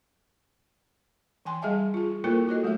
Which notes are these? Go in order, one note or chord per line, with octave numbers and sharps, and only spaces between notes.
E3 G5 G#5 C6
G3 G#4 D#5 E5 A5
F4 G#4
A#3 E4 F4 A4 A#4 C5
F#4 A4 C#5 D#5
F#3 A3 G4 E5